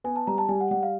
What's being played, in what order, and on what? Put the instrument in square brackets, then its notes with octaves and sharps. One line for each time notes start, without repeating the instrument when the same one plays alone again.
[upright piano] B3 [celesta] G#5
[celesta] A5
[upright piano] G3 [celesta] A#5
[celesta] A5
[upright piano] G3 [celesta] G#5
[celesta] F#5
[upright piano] G3 [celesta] F#5
[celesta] F5